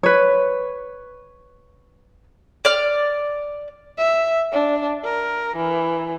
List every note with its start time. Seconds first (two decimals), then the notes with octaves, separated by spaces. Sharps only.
0.03 B4 C#5
2.65 D5 F6
3.98 E5
4.52 D4
5.04 A#4
5.57 E3